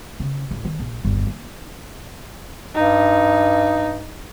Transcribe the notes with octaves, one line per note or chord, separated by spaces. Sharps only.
C#3
A1 D2
D#3
A#1
G1 D#2
A#3
G2 D#4